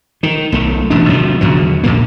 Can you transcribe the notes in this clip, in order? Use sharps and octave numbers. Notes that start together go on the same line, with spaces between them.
D#3
B1 A3
E1 A1 F2 D4
C3 D#3 F3 F#3
E2 D3 F#3
A#1 A#2 A#3